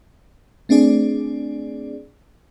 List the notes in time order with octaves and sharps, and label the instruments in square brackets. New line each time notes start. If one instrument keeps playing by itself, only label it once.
[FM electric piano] A3 C4 D4 G#4 D5